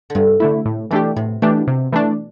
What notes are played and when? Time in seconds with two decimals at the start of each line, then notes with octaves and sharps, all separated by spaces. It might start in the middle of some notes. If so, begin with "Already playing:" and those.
0.10 D3
0.15 G2 C3
0.40 D3 A3 E4
0.65 A2
0.91 B2 E3 A3 D4 G4
1.16 A2 C3
1.42 B2 E3 A3 D4 G4
1.67 C3
1.92 E3 A3 D4